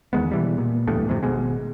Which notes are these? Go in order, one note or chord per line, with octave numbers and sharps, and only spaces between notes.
E2 D#3 G#3 B3
B2 E3 G3
A#2
D1 E2 G2 A3
F2 A2 C3
G#1 G#2 B2 G#3